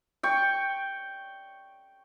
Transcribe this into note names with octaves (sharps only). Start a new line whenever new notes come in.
G5 C#6